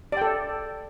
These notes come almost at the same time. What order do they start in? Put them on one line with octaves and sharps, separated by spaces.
D5 G5 A4